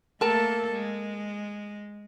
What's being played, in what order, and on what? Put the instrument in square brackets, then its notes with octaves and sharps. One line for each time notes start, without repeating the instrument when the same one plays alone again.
[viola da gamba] A3 A#3 A4 [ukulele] A#4 A5
[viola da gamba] G#3